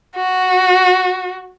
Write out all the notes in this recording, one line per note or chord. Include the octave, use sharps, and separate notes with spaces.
F#4